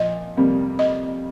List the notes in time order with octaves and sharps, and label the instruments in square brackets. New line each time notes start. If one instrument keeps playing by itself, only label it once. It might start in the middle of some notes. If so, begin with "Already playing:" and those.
Already playing: [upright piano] A#2 F3 [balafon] D#5
[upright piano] F2 C3 G3 A#3
[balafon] D#5